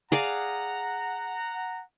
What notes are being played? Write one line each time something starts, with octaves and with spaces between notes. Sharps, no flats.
G#4 D5 F5 F#5 A#5